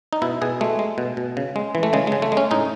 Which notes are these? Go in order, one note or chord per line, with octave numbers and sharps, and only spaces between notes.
D#4
B2 E4
B2 G#4
G#3 A3
G#3
B2
B2
C#3
G#3
E3
A3
C#3 G#3
C#3 G#3
A3
G#3
C#4
A2 D#4